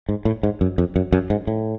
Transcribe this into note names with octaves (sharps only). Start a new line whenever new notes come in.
G#2
A2
G#2
F#2
F2
F#2
F#2
G#2
A2